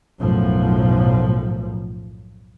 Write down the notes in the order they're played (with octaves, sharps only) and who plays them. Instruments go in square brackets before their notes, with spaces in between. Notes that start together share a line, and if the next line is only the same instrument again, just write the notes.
[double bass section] B1 F#2 A2 F3